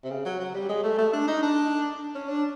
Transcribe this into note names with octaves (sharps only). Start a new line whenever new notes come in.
C3
C#3
F#3
F#3
G3
G#3
A3
A3
D4
D#4
D4
C#4
D4